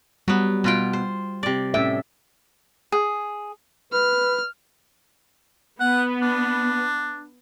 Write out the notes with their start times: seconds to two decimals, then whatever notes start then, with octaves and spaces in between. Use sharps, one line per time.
0.28 F#3 G3 B3
0.64 B2 G3 F4 G5
0.93 C5
1.43 C3 D5
1.74 A2 C#4 E5 G5
2.92 G#4
3.93 B4 F6
5.80 B3 F#5
6.22 D4